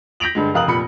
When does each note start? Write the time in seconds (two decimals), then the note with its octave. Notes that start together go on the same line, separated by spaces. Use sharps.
0.20 G6 A#6 B6 D7 F7 F#7
0.35 G2 D3 G#3
0.54 F1 A#4 F5 D#6 F#6 F#7
0.67 F1 A#2 B5 C#7